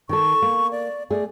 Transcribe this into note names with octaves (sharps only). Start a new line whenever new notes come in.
D#3 A4 C#6
A#3
D5
A3 G#4 D5